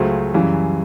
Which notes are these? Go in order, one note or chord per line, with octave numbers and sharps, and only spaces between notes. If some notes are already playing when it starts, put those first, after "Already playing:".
Already playing: C#2 C#3 F#3 A3 C5
F#2 C#3 E3 G3